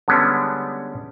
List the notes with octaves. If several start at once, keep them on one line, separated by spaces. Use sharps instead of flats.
D3 G3 G#3 B3 C#4 D4